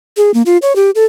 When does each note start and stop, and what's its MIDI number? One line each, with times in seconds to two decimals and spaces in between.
0.17 0.31 68
0.34 0.42 58
0.46 0.57 65
0.62 0.75 73
0.76 0.90 67
0.95 1.05 69